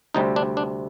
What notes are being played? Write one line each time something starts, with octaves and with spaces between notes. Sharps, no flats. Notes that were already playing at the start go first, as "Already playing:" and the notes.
D2 C3 G3 C4 D#4
D4
D4